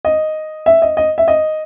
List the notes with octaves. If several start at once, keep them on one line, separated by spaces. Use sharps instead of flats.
D#5
E5
D#5
D#5
E5
D#5